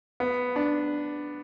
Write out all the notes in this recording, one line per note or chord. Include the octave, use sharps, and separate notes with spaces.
B3
D4